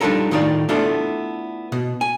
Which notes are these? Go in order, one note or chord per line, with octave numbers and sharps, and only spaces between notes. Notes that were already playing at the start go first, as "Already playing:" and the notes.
G3 D4 D#4 F4 A4 A#4
A2 D#3 D#4 F4 D5
A3 B3 D4 E4 F4 A4
B2
G#5